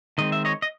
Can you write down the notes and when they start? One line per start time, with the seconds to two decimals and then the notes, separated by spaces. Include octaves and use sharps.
0.18 D#3 G#3 C4 D#5
0.32 E5
0.45 C#5 D#5
0.62 D#5